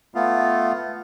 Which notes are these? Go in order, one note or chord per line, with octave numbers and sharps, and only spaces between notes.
A3 B3 F4